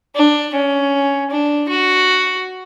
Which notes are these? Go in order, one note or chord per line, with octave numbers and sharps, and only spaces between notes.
D4
C#4
D4
F#4